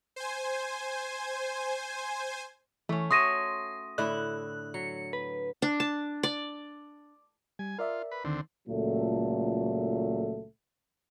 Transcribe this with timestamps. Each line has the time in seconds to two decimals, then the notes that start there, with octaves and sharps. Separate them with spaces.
0.16 C5 G#5
2.89 E3 A3 C#4
3.11 F#4 C#5 E5 C6 D#6 A#6 D#7
3.98 A2 D3 E4 F#6
4.74 F#3 C#7
5.13 B4
5.62 D4
5.80 A5
6.23 D5
7.59 G3 G#5
7.78 F4 A#4 D5 E5
8.11 B4
8.25 D2 D3 D#3 C4
8.68 C#2 A#2 F#3 A3 A4